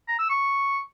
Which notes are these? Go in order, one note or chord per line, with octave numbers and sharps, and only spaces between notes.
A#5
E6
C#6